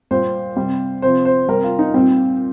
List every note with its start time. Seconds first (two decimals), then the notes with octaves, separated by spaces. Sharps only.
0.11 A#2 G3 C5
0.57 C3 G3
1.02 C3 F3 C5
1.25 C5
1.48 C3 G3 A#4
1.64 F4
1.79 D#4
1.94 A#2 G3 C4